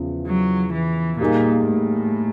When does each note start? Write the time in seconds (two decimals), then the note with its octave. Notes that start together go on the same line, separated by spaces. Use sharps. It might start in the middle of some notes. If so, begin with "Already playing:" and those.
Already playing: E2 C#3 F3
0.27 F#3
0.74 E3
1.20 A#2 G3 A#3 D#4 G#4
1.67 A2